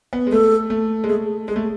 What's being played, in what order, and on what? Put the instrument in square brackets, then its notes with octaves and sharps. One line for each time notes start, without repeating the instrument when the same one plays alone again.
[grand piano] B3
G#3
[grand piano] A3 [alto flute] A4
[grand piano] A3
G#3
[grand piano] A3 [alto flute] G#4
[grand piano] G#3 [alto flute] G#4
[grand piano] A3